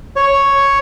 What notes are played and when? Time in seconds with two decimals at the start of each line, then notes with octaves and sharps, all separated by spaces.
0.16 C#5